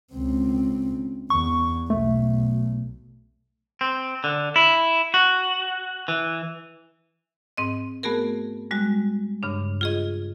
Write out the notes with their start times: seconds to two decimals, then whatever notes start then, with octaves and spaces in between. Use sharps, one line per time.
0.13 C#2 C4
1.30 E2 C#6
1.90 B1 A3
3.81 C4
4.24 D3
4.56 E4
5.14 F#4
6.08 E3
7.57 G#2 C4 D#5
8.03 A3 B3 F#4 G#4 A#4
8.71 G3 G#3 F#4
9.43 G2 C#3 D4
9.81 F4 G#4 D#5